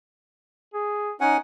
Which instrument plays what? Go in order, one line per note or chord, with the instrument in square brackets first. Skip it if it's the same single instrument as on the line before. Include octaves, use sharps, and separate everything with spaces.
[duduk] G#4
[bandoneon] C#4 F#5 G#5 [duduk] D#4